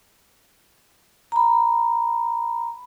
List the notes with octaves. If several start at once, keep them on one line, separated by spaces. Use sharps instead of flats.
A#5 B5